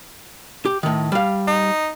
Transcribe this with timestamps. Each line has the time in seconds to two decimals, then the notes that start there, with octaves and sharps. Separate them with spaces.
0.65 G4
0.83 A2 D#3
1.12 G3 F5
1.47 D#4